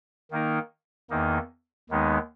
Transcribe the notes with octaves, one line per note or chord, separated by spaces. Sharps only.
D#3 A#3 D#4 A#4
E2 D#3 A#3 D#4
D#2 D#3 G#3 B3 D#4